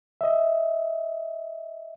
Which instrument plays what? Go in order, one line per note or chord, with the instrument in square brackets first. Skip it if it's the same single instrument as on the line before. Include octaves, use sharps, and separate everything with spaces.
[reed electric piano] D#5 E5